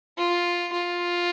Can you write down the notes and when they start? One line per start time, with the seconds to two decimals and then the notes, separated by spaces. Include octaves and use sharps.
0.18 F4
0.73 F4